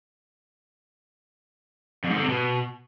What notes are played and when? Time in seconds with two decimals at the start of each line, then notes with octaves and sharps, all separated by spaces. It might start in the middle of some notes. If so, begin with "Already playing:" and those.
2.04 F2
2.11 G#2
2.17 D3
2.23 C3
2.29 B2